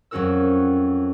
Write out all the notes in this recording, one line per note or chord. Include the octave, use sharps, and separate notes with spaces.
F2 F#3 C#4 F#4 A#4 E6